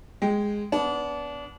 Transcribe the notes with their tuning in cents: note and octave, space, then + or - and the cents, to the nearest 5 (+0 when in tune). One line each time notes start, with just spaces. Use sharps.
G#3 -5 G5 +0
B3 +0 D4 -30